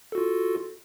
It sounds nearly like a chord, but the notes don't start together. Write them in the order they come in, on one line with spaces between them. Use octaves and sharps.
A4 F#4 F4